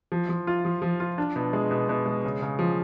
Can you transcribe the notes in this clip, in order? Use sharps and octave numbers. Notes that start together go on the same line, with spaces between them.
F3
F3
F4
F3
F3
F4
D4
B2
G#3
B2
B2
G#3
C#3
C#3
F3